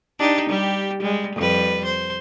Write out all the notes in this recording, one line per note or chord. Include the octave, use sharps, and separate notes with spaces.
D4 D#4 G4
G3 G4
G3 G#3
F2 G3 B4
C5